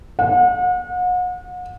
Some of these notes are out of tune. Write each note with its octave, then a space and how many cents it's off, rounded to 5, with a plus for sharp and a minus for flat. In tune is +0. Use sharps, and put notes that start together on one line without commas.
F#5 -40